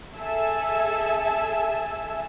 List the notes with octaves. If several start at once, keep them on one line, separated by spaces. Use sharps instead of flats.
G#4 A4 E5 G#5 E6